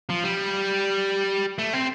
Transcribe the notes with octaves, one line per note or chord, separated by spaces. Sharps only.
F3
G3
A3
C4